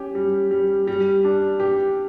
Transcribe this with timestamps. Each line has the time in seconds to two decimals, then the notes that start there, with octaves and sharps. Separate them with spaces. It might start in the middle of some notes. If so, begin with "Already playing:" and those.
Already playing: C#4 G4
0.15 G3
0.51 G3
0.87 G3
1.24 D4
1.60 G4